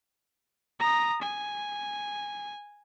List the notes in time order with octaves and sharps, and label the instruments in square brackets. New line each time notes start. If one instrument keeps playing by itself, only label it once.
[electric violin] A#5 D#6
G#5